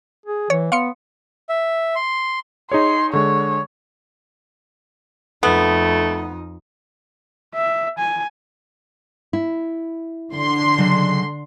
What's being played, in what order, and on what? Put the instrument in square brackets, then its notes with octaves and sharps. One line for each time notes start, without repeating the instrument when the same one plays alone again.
[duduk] G#4
[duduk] E3 [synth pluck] C#5
[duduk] B3 [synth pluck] F5 C6 C#7
[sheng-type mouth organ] E5
C6
[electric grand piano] D#4 G#4 C#5 [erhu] C6
[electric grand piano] D3 G#3 [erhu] C#5
[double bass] F2 D#4 [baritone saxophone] A3 [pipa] B3
[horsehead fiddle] E5
G#5
[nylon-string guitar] E4
[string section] D3 C6
[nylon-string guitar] C#3 F#3 D#5